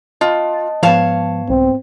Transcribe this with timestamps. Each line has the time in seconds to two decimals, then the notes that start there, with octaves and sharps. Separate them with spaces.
0.21 F4 D#5 A5
0.83 G#2 F3 B3 C#5 F5 A5
1.50 C2 C4